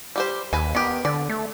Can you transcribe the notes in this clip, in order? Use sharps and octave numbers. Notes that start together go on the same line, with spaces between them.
G3 G4 C5
D#2 B4 G#5
D#3 B3 G4
D3 D5
A3